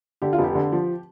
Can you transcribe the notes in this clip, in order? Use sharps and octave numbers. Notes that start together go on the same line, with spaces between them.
D3 G4
F4
F1
G4
D3
F3